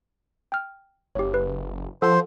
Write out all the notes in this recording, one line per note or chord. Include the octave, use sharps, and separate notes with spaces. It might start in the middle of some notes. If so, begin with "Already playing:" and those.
G5 F6
F#1 G4 C#5
B4
F3 A4 C5 F#5 C6